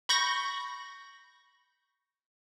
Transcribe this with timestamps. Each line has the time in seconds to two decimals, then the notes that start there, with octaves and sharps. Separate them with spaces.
0.09 B5 C#6 G6 A#6